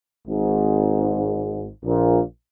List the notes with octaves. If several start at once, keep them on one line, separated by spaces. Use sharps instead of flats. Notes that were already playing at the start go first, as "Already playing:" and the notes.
G#1 G#2
A#1 A#2